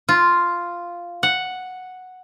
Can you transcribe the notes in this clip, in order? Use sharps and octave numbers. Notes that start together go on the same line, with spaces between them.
F4
F#5